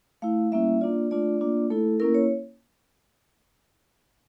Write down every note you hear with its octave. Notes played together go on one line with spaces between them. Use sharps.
A3 E4 F5
G3 A#3 C#4 E4 E5
A#3 D4 F4 D5
A3 D4 F4 D5
A#3 D4 F4
A3 E4 A4
A#3 C#4 E4 A#4
C#5